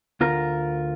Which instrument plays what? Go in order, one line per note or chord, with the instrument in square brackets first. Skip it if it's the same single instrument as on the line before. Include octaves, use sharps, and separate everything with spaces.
[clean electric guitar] D2 F4 A#4